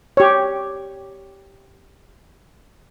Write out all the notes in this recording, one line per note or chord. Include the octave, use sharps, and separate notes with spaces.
G4 C#5